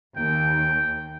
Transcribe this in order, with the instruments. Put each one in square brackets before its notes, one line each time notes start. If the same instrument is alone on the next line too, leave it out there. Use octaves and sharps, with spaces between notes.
[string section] D#2 [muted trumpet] G5